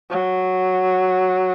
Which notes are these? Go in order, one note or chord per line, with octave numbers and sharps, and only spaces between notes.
F#3